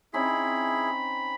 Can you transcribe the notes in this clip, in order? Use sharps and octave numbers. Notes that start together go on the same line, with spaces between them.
C4 C#4 D#4 E4 G#4 B5